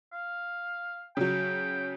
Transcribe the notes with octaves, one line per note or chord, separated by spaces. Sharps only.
F5
C#3 F#3 G5